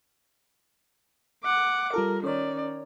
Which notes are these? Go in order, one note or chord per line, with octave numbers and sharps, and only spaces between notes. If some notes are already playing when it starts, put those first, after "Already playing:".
F#5 D6
G3 F4 A4 A#4
D#3 C#4 C#5 D5